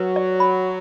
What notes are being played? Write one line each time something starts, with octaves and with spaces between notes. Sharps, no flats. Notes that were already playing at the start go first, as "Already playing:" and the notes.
Already playing: F#3 B4
D5
B5